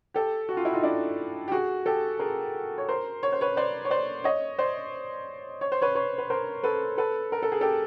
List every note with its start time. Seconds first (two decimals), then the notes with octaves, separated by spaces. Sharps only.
0.14 G4 A4
0.49 F#4
0.57 F4
0.65 E4
0.73 D#4 F4
0.83 D4 E4
1.48 G4
1.52 F#4 G#4
1.86 G4 A4
2.19 G#4 A#4
2.78 C#5
2.89 A#4 C5
3.23 C#5
3.32 C5
3.41 B4 C#5
3.57 C5 D5
3.85 C#5
3.90 C5 D5
4.24 C#5 D#5
4.59 C5 D5
5.61 C#5
5.72 C5
5.82 B4 C#5
5.95 B4 C#5
6.18 B4
6.30 A#4 C5
6.63 A4 B4
6.98 A4 B4
7.32 A#4
7.42 A4
7.52 G#4
7.61 G4 A4